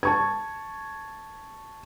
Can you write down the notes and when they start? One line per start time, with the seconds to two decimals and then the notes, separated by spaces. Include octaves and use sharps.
0.03 A5 C#6 G#6